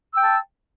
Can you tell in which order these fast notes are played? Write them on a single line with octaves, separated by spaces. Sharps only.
E6 G5 A5